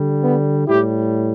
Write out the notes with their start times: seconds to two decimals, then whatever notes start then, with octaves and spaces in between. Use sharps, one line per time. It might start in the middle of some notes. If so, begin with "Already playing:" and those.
Already playing: D3 G3
0.23 B3
0.67 A2 G3 E4 G4